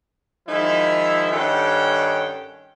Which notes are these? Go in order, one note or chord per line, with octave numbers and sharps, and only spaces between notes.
D#3 F3 G#3 D#4 E4
G2 D#3 C#4 A4 F#5 G5